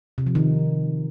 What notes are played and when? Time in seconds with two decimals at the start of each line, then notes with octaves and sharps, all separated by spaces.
0.18 C3
0.27 F3
0.35 D#3